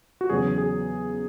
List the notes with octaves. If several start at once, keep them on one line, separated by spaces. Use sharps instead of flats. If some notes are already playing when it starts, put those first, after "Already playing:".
F#4
E2 C#3 F#3 G#4
G#4